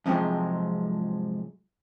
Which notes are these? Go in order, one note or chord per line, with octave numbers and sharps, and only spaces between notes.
F2 G#2 C3 F3 F#3 G#3